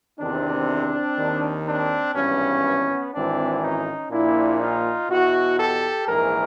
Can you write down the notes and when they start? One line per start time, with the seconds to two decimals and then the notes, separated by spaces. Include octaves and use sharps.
0.19 E2 C3 D#3 C4 D4
1.17 D#2 D#3
1.66 C4 D4
2.15 G#1 G2 E3 B3 C#4
3.13 G#1 G#2 E3 C4 D4
3.62 C#4 D#4
4.11 A#1 A#2 D4 E4
4.60 D#4 F4
5.10 E2 B2 E4 F#4
5.59 G4 A4
6.08 A#1 G#2 E3 G#4 A#4